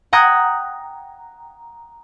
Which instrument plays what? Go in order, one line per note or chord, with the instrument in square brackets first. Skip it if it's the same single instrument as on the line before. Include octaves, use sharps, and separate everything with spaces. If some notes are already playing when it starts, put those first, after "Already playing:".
[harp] F#5 G5 A#5 D#6 F#6 G#6